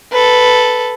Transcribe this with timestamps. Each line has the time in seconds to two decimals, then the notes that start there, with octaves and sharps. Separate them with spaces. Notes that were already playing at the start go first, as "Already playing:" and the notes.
0.13 A4 B4